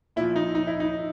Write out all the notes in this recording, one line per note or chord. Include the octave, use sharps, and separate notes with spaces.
A#2 F3 E4
D#4
D#4
E4
D#4